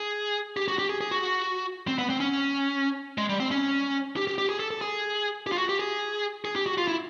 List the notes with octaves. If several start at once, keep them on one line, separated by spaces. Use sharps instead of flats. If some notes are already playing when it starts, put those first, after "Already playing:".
Already playing: G#4
G4
F#4
G4
G#4
G#4
F#4
C4
B3
C4
C#4
G#3
G3
C4
C#4
G4
G4
G4
G#4
A4
A4
G#4
G4
F4
F#4
G4
G#4
G#4
G4
F#4
F4
E4